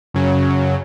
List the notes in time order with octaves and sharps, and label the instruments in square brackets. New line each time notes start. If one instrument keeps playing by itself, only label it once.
[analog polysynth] F#2 C#3 F#3